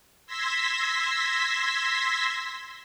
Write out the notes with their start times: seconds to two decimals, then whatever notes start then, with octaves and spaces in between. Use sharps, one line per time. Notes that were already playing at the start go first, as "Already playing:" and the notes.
0.26 C6 E6 G#6 A#6 B6